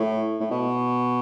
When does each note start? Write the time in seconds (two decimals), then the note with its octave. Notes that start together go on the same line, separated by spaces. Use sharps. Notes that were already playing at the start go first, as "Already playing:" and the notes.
Already playing: A2
0.40 A2
0.51 B2